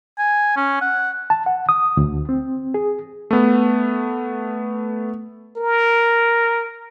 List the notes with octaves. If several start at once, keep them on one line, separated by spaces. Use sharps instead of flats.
G#5
C#4
F#5
A5
F#5
D#6
D2
C4
G#4
A3 B3
A#4